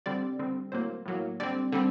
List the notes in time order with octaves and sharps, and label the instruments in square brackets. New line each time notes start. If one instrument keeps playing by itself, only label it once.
[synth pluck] D3 G3 C4 D5
D3 G3 C4
A2 F#3 A#3 C5
A2 F#3 A#3
D3 G3 C4 D5
D3 G3 C4